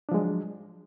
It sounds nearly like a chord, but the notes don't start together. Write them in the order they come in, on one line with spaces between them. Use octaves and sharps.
D4 F3 G#3 F#3